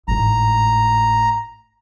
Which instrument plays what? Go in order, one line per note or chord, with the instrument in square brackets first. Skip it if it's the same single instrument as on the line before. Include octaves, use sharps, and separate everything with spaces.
[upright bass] G#1 A2 [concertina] A#5